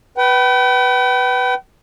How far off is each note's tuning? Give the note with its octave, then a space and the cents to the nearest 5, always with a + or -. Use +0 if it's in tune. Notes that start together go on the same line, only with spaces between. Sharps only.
B4 +0 G5 -40